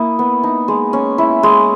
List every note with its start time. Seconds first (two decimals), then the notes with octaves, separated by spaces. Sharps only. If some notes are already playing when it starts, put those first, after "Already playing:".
Already playing: A#3 E4 D#6
0.19 B3
0.43 D#4
0.68 G#3
0.93 C#4
1.18 E4
1.43 G#3